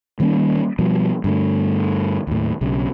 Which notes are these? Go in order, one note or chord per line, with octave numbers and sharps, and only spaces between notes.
D#3 G3 A#3 C#4
B2 F3 G3
G2 D3 A3
D#2 A2
B1 C#3